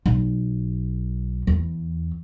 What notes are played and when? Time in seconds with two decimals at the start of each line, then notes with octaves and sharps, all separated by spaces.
0.06 B1
1.47 E2